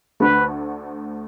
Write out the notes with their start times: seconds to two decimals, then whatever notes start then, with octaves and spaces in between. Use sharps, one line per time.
0.20 D2 D3 A3 B4